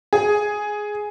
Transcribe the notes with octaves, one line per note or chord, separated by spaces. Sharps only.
G#4